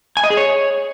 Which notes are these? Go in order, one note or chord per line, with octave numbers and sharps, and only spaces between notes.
G#5
D#5
G#4
C#5